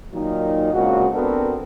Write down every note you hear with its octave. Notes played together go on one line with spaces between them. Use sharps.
A#2 D#3 F#3 D#4
A#2 C#3 G#3 C4 F#4
B3 C4 D4 F#4 A4 A#4